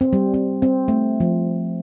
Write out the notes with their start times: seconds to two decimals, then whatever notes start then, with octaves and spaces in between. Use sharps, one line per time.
0.01 C4
0.13 G3
0.34 C4
0.62 C4
0.88 A3
1.20 F3